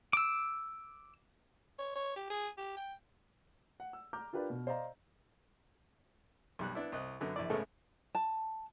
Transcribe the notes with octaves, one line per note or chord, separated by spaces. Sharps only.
D6 E6
C#5
C#5
G4
G#4
G4
G5
F#5
E6
A#5 D6 F6 G6
D4 F4 G4 A#4 B4 D5
B2
C5 D5 D#5 F5 A#5
B1 G3 F#6
B3 D4 E4
C2 D#5 F#6
F#2 D3 B3
A#1 E4 D5
A2 C#3 G#3 A3 B3 A4
A5